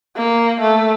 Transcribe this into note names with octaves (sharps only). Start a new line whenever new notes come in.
A#3
A3